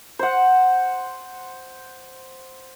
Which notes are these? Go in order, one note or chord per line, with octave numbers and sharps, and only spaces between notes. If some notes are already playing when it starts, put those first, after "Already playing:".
C5 F#5